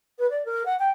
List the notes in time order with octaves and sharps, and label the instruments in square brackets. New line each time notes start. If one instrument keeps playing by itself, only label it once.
[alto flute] B4
D5
A#4
F#5
G5